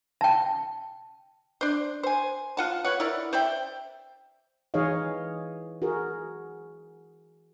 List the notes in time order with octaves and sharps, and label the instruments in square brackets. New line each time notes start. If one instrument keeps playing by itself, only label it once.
[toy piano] G5 A5
[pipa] D4 C5
C5 G#5
F4 F#5 A5
B4 C#5 F#5
E4 A#4 D5
C5 D5 E5 G5
[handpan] E3 D#4 G#4 C#5 D#5 F5
F#4 G#4 A#4